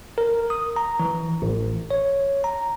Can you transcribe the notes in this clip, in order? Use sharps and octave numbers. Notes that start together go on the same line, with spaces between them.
A#4
D#6
A#5
E3
A1
C#5
A#5